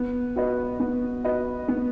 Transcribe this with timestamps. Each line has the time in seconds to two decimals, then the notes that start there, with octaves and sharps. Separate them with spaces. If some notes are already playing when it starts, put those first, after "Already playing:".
Already playing: B3
0.36 F#4 B4 D#5
0.80 B3
1.24 F#4 B4 D#5
1.68 B3